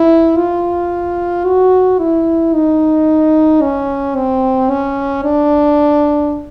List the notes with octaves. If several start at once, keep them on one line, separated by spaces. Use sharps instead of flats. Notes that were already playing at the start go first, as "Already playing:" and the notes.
Already playing: E4
F4
F#4
E4
D#4
C#4
C4
C#4
D4